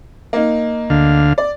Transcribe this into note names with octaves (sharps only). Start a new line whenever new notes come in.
A#3 D#4
D2 D3 F5
D5